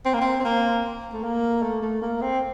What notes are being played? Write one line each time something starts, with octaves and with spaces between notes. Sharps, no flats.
C4
A#3
C4
C4
A#3
A3
A#3
A3
A3
A#3
C4